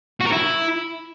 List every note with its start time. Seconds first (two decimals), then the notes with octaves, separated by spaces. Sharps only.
0.21 F#4
0.26 A#4
0.32 E4